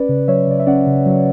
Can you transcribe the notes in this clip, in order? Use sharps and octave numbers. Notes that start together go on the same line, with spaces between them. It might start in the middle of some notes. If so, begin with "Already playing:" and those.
Already playing: C#4 B4 D5
C#3
F#3 C#5 E5
C#3 D5
E5
C#4 D5 F#5
C#3
F#3